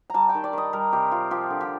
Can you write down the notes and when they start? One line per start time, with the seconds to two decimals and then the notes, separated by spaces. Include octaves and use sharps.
0.10 G3 A5 A#5
0.29 G5
0.35 D#3
0.44 D5
0.53 D#3 D#5
0.73 G3 A#4
0.93 C3 G4
1.12 C4 F4
1.31 F3 G4
1.50 D3
1.61 G4